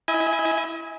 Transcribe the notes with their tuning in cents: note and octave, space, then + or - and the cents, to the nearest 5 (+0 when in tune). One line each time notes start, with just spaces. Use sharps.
E4 +0 D#5 +45 G#5 -5